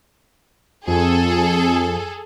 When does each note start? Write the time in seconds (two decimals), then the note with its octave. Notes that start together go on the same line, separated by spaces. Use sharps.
0.87 F2 G#4 A4